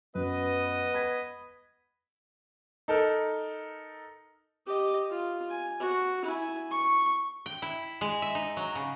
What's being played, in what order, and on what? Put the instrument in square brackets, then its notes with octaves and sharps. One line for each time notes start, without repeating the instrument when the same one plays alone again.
[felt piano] F#2 [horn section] B3 B4 D#5
[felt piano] B5 G#6 B6
[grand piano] D#4 A4 A#4
[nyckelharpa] G4 D#5
F4
G#5
F#4
E4 G#5
C#6
[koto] G5
E4
G#3
E5
D#4
F#3
C#3